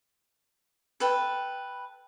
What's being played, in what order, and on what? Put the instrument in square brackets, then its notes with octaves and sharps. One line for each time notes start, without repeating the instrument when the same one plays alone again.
[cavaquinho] A4 B4 G5